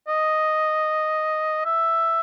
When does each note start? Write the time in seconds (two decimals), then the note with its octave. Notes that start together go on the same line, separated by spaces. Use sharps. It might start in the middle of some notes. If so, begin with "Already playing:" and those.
0.08 D#5
1.65 E5